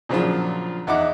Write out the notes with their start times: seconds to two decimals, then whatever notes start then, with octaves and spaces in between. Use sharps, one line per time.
0.09 A#2 C#3 F3 F#3 D4 F4
0.87 E2 D#4 E4 F#5 D6